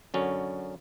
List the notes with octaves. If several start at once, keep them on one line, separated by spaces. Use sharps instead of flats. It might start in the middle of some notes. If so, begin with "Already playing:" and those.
F#2 D3 F#3 C#4